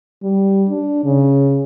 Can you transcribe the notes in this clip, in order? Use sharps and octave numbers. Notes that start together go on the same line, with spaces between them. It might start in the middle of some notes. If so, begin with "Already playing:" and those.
G3
D4
C#3